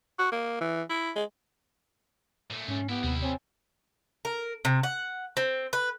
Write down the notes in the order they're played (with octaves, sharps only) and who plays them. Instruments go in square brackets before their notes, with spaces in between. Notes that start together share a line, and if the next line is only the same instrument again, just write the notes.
[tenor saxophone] F#4
A#3
E3
E4
G#3
[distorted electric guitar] A#2 A3
[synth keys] G#2 [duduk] C#4
[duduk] B3 [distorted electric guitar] E4 G4
[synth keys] D#2 C3 [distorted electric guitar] G3 E4
[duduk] C4 [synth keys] C#5 G#5
[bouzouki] A#4
C3
F#5
C4
B4